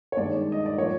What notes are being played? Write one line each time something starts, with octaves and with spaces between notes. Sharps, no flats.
C#5
G2 D#3 G#3 D5
D#5
D5
A#2 F3 A#3 C#5